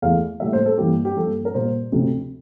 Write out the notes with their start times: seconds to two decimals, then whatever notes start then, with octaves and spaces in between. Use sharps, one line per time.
0.02 E2 E3 A3 F5
0.40 A2 G3 A#3 E5
0.53 C5
0.66 A4
0.78 G2 E3 A#3 G4
1.05 G4
1.17 G2 F3 A#3 A4
1.45 A#4
1.54 A#2 G3 A#3 C5
1.92 D2 C3 F3